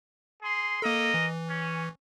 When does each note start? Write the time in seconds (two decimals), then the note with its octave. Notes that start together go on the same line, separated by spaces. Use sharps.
0.42 G#4 C6
0.82 A#3 A4 A#4 D#5
1.14 E3
1.48 C#4